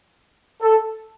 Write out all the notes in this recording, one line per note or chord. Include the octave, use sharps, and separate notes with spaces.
A4